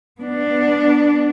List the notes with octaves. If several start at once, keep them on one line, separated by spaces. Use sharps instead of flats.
B3 D4